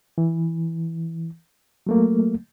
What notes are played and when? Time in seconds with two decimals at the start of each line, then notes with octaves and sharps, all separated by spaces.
0.18 E3
1.87 F#3 A3 A#3